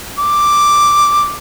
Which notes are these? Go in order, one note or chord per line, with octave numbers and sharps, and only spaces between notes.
D6